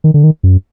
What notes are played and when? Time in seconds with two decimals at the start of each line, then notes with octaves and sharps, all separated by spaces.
0.04 D#3
0.14 D3
0.24 D#3
0.43 F#2